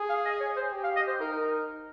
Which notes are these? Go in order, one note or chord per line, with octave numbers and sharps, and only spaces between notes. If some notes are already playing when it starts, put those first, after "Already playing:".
Already playing: G#4
F5
D#5
C#5
C5
G4
F5
D#5
C5
D#4 A#4